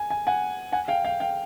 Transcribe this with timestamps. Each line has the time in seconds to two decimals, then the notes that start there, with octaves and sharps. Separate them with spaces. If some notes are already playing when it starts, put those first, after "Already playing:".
Already playing: G#5
0.10 G#5
0.27 F#5 G#5
0.72 F#5 G#5
0.88 F5 G5
1.05 F5 G5
1.20 F5 G5